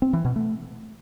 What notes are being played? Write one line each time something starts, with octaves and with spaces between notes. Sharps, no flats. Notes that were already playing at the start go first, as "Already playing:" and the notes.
C4
E3
B2
A3